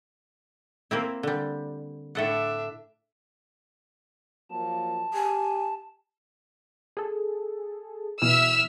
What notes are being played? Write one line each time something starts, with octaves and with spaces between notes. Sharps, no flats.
A#3 C4 E4
D3 G3
A2 D4 A4 E5 F#5
F3 F#3 A#3 A5
G4 G#5
G#4 A4
B2 E3 E5 E6 F6